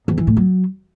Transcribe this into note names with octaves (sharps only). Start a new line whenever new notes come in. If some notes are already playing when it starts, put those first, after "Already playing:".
E2
E3
A2
F#3